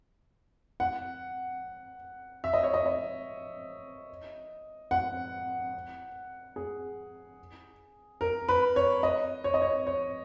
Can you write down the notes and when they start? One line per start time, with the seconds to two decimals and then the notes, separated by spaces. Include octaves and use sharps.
0.80 F#5
2.44 E5
2.53 D#5
2.63 C#5
2.74 D#5
2.86 D#5
4.91 F#5
6.56 G#4
8.21 A#4
8.49 B4
8.76 C#5
9.03 D#5
9.44 C#5
9.54 D#5
9.62 C#5
9.87 C#5